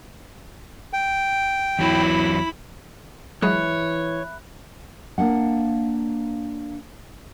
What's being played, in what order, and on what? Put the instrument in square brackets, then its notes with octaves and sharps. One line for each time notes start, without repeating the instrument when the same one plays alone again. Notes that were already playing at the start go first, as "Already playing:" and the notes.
[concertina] G5
[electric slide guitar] E2 F#3 [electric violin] E4 B5
[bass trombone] E3 [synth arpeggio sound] F#3 G#3 G#4 [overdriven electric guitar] C#5 [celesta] E5 B5 F#6
[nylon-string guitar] A#3 D4 F5 F#5